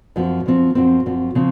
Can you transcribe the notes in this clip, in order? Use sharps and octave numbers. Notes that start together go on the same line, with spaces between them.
F#2 F3 C4
F#2 F3 C4
F#2 F3 C4
F#2 F3 C4
C#3 F3 C4